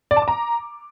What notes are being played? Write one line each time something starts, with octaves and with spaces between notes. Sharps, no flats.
D5
A5
D6
A#5